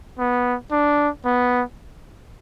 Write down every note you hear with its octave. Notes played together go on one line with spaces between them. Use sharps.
B3
D4
B3